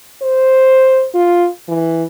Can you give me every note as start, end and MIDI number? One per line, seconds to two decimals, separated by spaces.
0.22 1.05 72
1.15 1.48 65
1.69 2.04 52